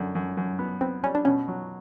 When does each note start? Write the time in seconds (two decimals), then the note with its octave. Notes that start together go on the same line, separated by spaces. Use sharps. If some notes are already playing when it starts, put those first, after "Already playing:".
Already playing: F#2 D3
0.15 F#2
0.37 F#2
0.59 B3
0.81 B3 C4
1.03 G3 C#4
1.15 D4
1.25 B2 C#4
1.48 F#3